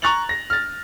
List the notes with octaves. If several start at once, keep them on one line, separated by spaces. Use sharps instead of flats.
A#5 C#6 F#6 A6 F7 F#7
A#6
F6 A6